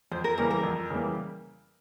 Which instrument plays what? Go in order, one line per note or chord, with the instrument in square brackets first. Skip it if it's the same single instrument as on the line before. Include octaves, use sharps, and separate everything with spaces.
[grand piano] F2 [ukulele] C5
[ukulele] A#4
[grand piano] C#3 E3 G3 A#3 [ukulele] A#4
[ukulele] A#4
[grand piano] F2
C#3 E3 G3 A#3